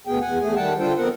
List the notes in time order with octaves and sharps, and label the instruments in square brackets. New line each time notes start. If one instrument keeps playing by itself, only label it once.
[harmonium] D2 B2 B3 G#4 G5
E2 F#5 G#5
E2 A3 G#4 G#5
D#3 G3 F#5 G5 A5
D3 D4 F4 A4 C5 G5
F2 B3 C4 A#4 F#5